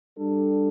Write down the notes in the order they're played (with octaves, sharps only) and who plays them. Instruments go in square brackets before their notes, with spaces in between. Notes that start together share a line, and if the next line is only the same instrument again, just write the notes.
[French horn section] G3 D4 A4